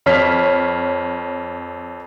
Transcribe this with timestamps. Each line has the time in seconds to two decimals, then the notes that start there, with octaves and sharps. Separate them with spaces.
0.06 F2 C#5 F6 B6